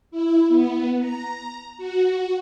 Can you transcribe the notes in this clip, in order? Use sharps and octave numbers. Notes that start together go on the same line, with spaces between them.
E4
B3
A#5
F#4